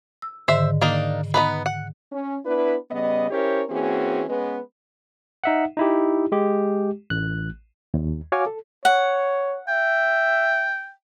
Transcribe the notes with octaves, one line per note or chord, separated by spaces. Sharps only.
E6
G#2 D3 D#3 C5 E5
A#3 D4 D#4
B3 D#4 B4
F#5
C#4
B3 D4 E4 B4
C#3 G3 B3 D#5
C#4 E4 G4 A#4 C5 C#5
E3 A#3 C4 C#4 F#4 G#4
G#3 B3 C#4 B4
D#4 E5 F#5
D#4 E4 G4
G#3 G4
A1 F#6
D#2
F#4 C#5 F5 G#5 D6
A4
C#5 F#5
E5 G5